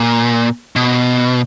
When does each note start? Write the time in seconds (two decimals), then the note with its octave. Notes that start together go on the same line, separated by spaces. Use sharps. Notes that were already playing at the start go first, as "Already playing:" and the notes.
Already playing: A#2
0.76 B2